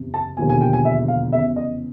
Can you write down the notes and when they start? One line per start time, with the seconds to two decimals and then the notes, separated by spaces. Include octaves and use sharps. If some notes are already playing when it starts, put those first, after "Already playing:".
Already playing: F#1 E2 C3
0.14 A5
0.37 E1 D#2 D3 F3 A#3 G#5
0.49 G#5
0.61 G5
0.73 G#5
0.85 E5
1.08 F5
1.32 F1 E2 C#3 E5
1.56 D#5